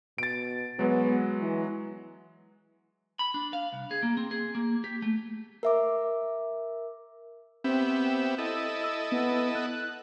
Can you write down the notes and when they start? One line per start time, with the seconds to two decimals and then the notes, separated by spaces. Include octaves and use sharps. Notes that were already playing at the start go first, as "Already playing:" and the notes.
0.18 B2 A6 D7
0.79 F#3 G#3 B3
1.39 E3
3.19 B5
3.34 D4
3.53 F5
3.73 C2
3.91 G#4
4.03 A#3
4.17 C4
4.31 G#4
4.55 A#3
4.84 G4
5.02 A3
5.63 A#4 E5 D6
7.64 B3 C4 G4 E5
8.38 E4 A4 D#5 E6
8.83 E6
9.12 B3
9.55 F#6